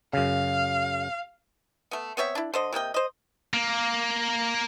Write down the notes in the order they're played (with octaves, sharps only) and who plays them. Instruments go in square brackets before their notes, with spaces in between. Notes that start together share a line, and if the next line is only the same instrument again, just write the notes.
[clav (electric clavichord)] F#2 C#3 [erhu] F5
[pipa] A3 B3
B3 C4 C#5 E5
D4 E4
D3 C5 D#5
C3 A#3 D#5 G5
C5 D#5
[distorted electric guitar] A#3